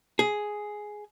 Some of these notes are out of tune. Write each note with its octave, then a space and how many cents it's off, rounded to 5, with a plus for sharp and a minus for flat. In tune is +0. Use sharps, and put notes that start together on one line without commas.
G#4 +5